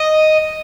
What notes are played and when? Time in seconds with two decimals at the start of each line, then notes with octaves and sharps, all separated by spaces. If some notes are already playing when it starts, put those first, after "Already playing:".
Already playing: D#5